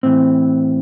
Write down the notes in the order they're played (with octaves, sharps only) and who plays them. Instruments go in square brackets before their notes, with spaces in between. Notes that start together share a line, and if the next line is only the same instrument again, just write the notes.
[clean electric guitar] A2 E3 C4